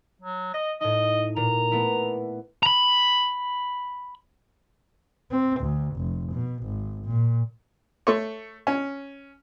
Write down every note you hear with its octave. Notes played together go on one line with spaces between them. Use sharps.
F#3
D#5 A#6
A2 D#4 D#5
A#2 A#5
A3 B3 E4
A#5 B5
C4
D2
F1
B2
G#1
A#2
A3 C#5
C#4